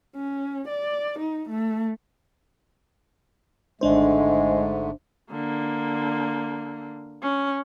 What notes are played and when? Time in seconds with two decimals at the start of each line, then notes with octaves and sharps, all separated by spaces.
0.16 C#4
0.68 D5
1.19 D#4
1.49 A3
3.81 G#1 G#2 D3 G#3 A3 D4 C5
5.31 D3 A#3
7.22 C#4